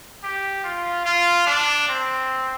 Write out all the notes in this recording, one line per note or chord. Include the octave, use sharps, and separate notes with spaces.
G4
F4
F4
D4
C4